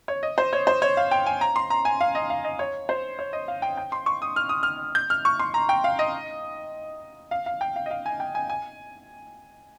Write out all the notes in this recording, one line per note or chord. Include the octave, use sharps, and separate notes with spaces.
C#5
D#5
C5
C#5
C5
C#5
F5
G5
G#5
A#5
C6
A#5
G#5
F5
D#5
F5
D#5
C#5
C5
C#5
D#5
F5
G5
G5
C6
C#6
D#6
F6
D#6
F6
G6
F6
C#6
C6
A#5
G5
F5
D#5
F5
F5
G5
F5
D#5
F5
G#5
G5
G#5
G#5